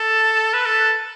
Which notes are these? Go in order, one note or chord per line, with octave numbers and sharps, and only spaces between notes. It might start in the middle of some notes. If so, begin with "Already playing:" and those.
Already playing: A4
B4
A4